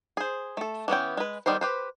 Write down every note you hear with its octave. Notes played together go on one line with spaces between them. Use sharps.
G#4 C5
A3 A4
E3 B3 C#4 G5
G#3 B4
D#3 G3 B3 C5
G4 B4 C5